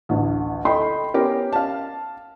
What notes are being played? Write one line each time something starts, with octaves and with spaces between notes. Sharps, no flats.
A1 D2
A4 D#5 G5 B5 C6
B3 C#4 G4 A#4
F5 A5